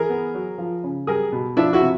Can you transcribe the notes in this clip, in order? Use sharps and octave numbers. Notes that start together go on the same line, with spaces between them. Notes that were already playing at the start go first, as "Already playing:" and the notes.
Already playing: E3 G#4 A#4
B3
F#3
F3
C#3
G3 G#4 A#4
B2
F3 D4 E4
E4 F#4
C3